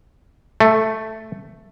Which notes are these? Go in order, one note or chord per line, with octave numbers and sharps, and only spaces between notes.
A3